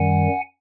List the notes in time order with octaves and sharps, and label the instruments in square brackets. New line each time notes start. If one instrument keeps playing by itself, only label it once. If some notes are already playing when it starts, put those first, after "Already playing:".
Already playing: [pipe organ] F#2 D#3 G3 F#5 G#5